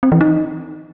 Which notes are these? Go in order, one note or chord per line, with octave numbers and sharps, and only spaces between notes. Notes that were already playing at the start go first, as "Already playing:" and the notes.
C4
E3
D#4